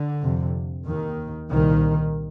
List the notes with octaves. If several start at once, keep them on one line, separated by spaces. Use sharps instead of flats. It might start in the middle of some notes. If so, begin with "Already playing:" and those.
Already playing: D3
F2 C3
D#2 D#3
C2 A#2 D#3